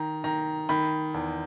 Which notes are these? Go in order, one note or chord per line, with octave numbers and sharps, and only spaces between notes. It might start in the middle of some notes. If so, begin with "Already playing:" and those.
Already playing: D#3 A#5
D#3 A#5
D#3 B5
E2